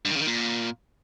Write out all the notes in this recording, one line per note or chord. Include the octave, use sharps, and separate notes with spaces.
G2
D#3
C#3
D#3
A#2